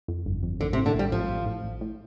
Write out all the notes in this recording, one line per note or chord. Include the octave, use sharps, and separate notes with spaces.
F2
G1
F2
A1 D3
C3
A2
D3
A1 G3
A1 F3
A1
A2
A1
A2